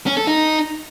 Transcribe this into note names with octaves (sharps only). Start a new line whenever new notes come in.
C#4
A4
D#4